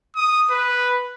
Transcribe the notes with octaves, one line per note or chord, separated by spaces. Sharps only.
D#6
B4